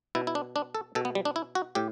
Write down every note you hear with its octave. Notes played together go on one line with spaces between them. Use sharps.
B2 E4
E4
D4
D4
A4
B2 A4
B3
G3
D4
E4
F#4
A2 G4